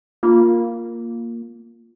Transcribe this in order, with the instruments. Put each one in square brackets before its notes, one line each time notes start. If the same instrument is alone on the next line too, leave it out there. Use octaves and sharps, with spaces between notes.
[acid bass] A#3 [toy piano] F4